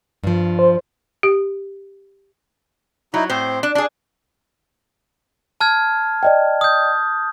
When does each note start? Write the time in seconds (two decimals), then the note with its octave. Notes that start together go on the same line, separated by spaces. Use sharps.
0.24 G2 F3
0.59 C5
1.23 G4
3.14 F#3 D#4 E4
3.30 A2 C4 C5
3.63 D4
3.75 D4 G#4 A5
5.60 A5 F6 G#6
6.23 D5 D#5 G5
6.61 D#6 G6